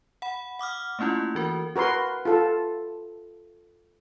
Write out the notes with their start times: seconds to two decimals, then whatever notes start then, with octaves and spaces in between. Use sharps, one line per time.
0.22 F#5 B5
0.59 F#5 D6 D#6 F6
0.99 A3 A#3 C#4 E4 F4
1.35 E3 F#4 A#4
1.76 F#4 A#4 B4 C6
2.25 F4 A4